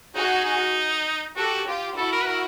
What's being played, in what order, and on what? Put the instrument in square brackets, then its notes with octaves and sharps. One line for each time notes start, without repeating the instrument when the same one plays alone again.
[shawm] D#4 [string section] F#4 G#4
[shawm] D#4
[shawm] F#4 [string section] G4 A4
[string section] F4 G4
[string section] E4 F#4 [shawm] A4
[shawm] A#4
B4
A#4